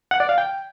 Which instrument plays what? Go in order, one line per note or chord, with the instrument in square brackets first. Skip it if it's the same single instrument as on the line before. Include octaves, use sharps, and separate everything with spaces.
[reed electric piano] F#5
D5
F5
G5